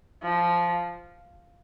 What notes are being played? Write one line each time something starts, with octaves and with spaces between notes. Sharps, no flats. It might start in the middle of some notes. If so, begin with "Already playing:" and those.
F3